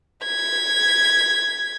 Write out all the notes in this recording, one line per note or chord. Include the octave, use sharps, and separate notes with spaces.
G#6 B6